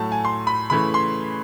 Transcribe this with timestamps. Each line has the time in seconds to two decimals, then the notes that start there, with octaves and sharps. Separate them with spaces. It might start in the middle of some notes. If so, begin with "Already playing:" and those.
Already playing: A2 F#3 A3 A5
0.12 G#5
0.25 C6
0.47 B5
0.70 C#3 E3 A3 B5
0.94 C6